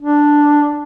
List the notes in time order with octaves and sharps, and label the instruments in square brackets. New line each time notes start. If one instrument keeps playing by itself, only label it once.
[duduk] D4